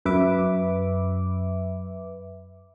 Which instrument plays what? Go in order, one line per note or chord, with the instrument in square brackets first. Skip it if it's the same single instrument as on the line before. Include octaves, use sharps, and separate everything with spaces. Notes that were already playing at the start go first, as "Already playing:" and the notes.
[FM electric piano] F#2 B4 E5 D6